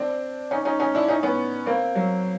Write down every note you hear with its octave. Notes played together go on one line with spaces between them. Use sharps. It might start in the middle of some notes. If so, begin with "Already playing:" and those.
Already playing: C4 D4
C#4 D#4
C#4 D#4
C#4 D#4
D4 E4
C#4 D#4
B3 C#4
A#3 C4
F#3